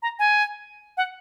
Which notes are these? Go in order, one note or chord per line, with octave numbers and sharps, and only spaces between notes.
A#5
G#5
F#5